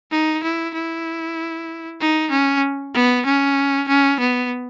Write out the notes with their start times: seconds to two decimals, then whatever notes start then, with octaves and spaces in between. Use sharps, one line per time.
0.11 D#4
0.44 E4
0.74 E4
2.00 D#4
2.31 C#4
2.95 B3
3.26 C#4
3.88 C#4
4.20 B3